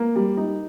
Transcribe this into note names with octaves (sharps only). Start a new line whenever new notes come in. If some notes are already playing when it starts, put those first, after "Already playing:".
Already playing: A#3
G3
D#4